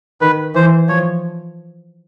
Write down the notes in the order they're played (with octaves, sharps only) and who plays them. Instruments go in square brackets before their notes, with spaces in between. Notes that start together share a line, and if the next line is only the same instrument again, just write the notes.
[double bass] D#3 [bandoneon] B4
[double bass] E3 [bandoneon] C5
[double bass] F3 [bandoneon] C#5